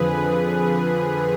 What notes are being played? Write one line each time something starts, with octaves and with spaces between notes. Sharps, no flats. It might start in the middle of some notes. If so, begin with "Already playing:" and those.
Already playing: F2 D3 F3 G#4 B4